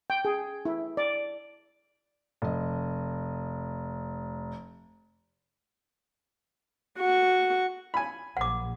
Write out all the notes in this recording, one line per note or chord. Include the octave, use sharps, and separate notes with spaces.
G5
G#4
E4
D5
F1 D#5
F#4 C#6
G#5 B5
A#1 F#5 D6